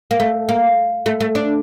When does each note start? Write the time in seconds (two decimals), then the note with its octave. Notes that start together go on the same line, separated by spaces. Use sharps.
0.11 A#3
0.20 A3
0.49 A#3
1.06 A3
1.20 A3
1.35 D4